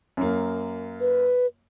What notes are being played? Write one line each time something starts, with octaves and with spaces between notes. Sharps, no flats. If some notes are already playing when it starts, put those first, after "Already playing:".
F#2 A#3
B4